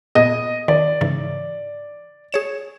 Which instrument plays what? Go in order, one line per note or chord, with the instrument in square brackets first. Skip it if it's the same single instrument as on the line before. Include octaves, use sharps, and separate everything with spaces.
[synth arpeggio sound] A#2 B3 G#4 [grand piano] D#5
[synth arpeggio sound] D#3 [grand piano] D5
[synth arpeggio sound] G#2 C#3 E3
G#4 C#5 E7